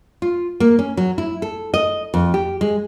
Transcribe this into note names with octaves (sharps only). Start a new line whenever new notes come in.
F4
A#3
C#4
F#3
E4
A4
D#5
F2
G4
G#3